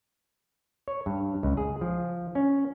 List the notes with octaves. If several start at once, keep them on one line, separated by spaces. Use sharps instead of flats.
C#5
G2
C#2
G#4
F3
C#4